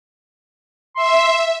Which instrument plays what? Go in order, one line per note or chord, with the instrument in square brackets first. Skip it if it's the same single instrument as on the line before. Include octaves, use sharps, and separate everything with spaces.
[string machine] E5 [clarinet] C6